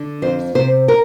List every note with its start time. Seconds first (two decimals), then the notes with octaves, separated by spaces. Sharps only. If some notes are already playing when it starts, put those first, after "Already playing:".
Already playing: D3
0.22 F2 C5
0.55 C3 C5
0.88 A#4